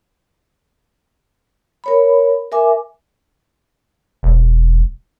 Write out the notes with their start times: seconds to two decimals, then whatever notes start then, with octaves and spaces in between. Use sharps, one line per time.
1.84 A#4 C#5 B5
2.52 A#4 E5 G#5 D6
4.23 E1